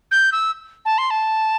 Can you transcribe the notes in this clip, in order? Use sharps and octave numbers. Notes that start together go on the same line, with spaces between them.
G6
E6
A5
C6
A5